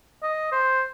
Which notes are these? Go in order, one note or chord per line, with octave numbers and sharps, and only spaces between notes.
D#5
C5